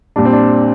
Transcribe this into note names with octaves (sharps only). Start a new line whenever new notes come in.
A#2 G3 D4
C4
D4